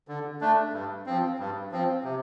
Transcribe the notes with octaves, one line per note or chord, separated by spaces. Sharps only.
D3
A3 D4
G2
F3 C4
G2
F3 C4
C3